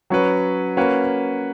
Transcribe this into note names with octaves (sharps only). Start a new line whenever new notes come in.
F#3 C#4 F#4 B4
A#3 C#4 F#4 B4